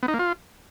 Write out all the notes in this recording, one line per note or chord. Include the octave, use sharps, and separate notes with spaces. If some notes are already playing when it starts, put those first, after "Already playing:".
B3
D#4
A#3
F4